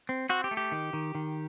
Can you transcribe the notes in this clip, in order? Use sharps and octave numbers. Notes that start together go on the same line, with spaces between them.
C4
C4 F#4
G4
A3
G4
D#3
D#3
D#3